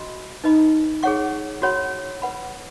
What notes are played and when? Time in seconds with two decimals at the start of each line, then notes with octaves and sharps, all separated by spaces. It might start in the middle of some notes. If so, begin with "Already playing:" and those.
Already playing: F#4 D#5 B5
0.44 D#4 B4 D#5 B5
1.03 G#4 C#5 F#5 C#6
1.62 F#4 C#5 F#5 B5
2.22 B4 F#5 B5